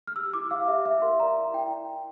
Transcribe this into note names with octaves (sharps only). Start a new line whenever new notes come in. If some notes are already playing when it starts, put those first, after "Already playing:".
F6
G4 E6
E4 D6
G4 F5
G4 E5
E4 E5
A#4 C6
D5 A#5
E4
E4 G5